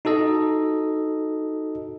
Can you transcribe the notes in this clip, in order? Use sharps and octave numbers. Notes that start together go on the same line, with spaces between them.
D#4 F#4 A4 D#5